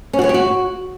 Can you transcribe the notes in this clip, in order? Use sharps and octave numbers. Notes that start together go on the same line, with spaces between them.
C#4
F#4
C#5
G4
F#4